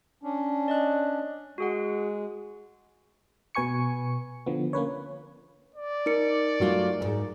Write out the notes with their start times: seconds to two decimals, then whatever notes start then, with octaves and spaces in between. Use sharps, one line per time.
0.23 C#4 D4
0.68 D5 D#5 F#6
1.58 G#3 F#4 G#4 F#5
3.55 B2 B4 G#5 C#6 C#7
4.46 D3 F3 B3
4.73 A#3 C#4 B4 C#5
5.75 D5
6.06 D#4 A#4 C#7
6.60 F#3 A3 F4
7.01 E2 G#2